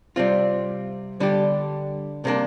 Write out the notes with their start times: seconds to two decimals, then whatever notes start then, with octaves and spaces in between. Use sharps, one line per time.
0.16 C3 G3 C4 F4
1.20 D3 G3 D4 G4
2.25 C3 A#3 D4